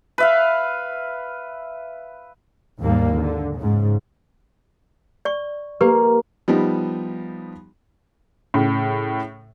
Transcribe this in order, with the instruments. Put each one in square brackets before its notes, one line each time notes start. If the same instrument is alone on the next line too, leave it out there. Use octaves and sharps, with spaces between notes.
[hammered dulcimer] B4 E5 F5
[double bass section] D#2 G#2 G3 A#3
D3
G#2 C#3
[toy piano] D5 C#6
[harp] A#3 [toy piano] G4 B4
[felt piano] F3 G3 B3 D#4
A2 C#3